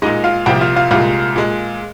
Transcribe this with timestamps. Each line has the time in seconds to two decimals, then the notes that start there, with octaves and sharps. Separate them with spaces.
0.02 A#2 G#3 D#4 D#5
0.24 F4 F5
0.46 C2 A#2 F3 G4 G5
0.61 F4 F5
0.76 F4 F5
0.91 C2 A#2 G#3 F4 F5
1.36 A#2 G#3